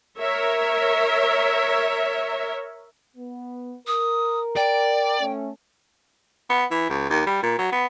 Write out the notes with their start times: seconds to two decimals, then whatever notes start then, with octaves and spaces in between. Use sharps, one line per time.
0.20 A#4 C#5 E5
3.17 B3
3.87 A#4 D#6
4.56 D5 G5
5.20 A3 C#4
6.50 B3
6.71 E3
6.89 C#2
7.09 D#2
7.26 G3
7.43 A#2
7.59 F#3
7.72 B3